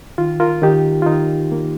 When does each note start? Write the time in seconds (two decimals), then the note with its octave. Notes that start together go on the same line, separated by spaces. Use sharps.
0.18 D#3 F4
0.40 F4 A#4
0.62 D#3 D#4 G4
1.02 F4
1.06 D#3 D#4
1.52 A#3